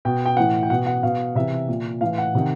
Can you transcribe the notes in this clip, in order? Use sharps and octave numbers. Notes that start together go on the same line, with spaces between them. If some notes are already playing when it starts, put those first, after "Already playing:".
B2 G5
G5
A2 E3 F#5
G5
B2 F#5
F#5
B2 F5
C3 E3 E5
A#2
A2 E3 F5
F#5
C3 D#3